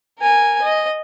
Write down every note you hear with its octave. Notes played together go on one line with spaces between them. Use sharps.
A#4 G#5
D#5